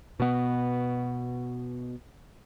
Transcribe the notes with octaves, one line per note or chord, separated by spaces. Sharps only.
B2 B3